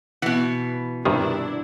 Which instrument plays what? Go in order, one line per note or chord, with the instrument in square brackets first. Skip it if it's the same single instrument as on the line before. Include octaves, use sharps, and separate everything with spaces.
[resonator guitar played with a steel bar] B2 E3 [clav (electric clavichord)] F#5
[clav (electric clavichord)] G2 C3 D#3 [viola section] D4 E4